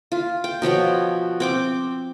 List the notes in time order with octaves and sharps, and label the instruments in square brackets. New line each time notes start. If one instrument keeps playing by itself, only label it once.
[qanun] F4
G5
B2 F3 C#5 G5
C4 G5 D6